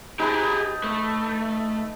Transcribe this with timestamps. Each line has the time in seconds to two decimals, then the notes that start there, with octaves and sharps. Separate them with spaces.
0.19 D#4 G4 G#4 B4 A5
0.84 A3